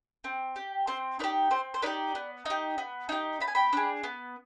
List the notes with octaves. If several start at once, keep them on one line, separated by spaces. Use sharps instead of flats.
C4
G4
C4 C5
D#4 G4 B4 D5
C4 C5
C5
D#4 G4 B4 D5
B3
D#4 G4
B3
D#4 G4
B3 B5
G#5
G5 B5
D4 G#4
B3